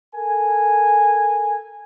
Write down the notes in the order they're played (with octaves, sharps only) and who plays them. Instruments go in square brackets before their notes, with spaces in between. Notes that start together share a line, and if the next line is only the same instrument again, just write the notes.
[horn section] A4 A#4 G#5